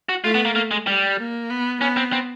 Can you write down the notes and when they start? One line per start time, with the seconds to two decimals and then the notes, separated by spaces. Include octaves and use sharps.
0.09 F#4
0.24 A3 F4
0.35 B3
0.45 A#3
0.56 A#3
0.71 G#3
0.87 G3
1.18 A#3
1.50 B3
1.81 B3 C#4
1.97 C4
2.13 C4